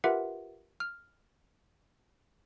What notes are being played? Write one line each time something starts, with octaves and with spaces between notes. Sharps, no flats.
F4 G4 A#4 B4 E5 F#5
F6